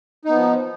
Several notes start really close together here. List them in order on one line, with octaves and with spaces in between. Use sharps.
D#4 B3 F3